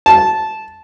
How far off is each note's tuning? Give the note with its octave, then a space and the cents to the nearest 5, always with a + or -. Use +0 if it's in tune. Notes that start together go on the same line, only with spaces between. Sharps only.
A5 -10